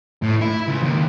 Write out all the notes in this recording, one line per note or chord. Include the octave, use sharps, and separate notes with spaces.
A2
E4
C#2
D#2